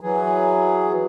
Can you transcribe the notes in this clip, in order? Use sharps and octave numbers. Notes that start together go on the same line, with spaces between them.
E3 F#3 G#4